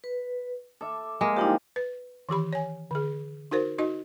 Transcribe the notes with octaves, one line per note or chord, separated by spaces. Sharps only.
B4
A4 E5 D6
G#3 A#3
F3 G3 D#4 E4 G4
B4
D#3 E3 G4 B5
C#5 G#5
D3 G#4
D#4 F#4 A#4 C5
D#4 F#4 D#5